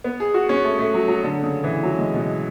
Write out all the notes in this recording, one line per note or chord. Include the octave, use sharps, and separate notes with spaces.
B3
G#4
F#4
C#4
A3
A3
F#3
F#3
D3
C#3
E3
F#3
G#3
B2